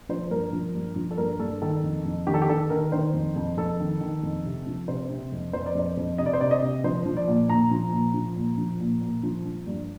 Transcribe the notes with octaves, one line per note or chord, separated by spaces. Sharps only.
F3 C5
G2 A#4
F3
G2
F3
A4
G2 A#4
G2 A4
D#3 A4
F2
F2
D#3 G4
A4
G4
D#3 A4
D#3 A#4
D#3 C5
F2
F2
F2 A4
D#3
D#3
F2
C3
F3
C3 C5
C3
F2
F2 C5
D5
F2 C5
F2
C3 D#5
D5
C5
C3 D5
D#5
C3
F3 C5
F3
D5
A#2
A#2 A#5
F3
A#2
F3
A#2
F3
A#2
A#2
F3
F3
G2